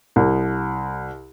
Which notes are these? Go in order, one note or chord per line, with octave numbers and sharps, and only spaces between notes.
C2